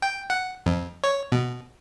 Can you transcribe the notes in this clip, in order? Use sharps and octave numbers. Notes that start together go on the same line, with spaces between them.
G5
F#5
F2
C#5
B2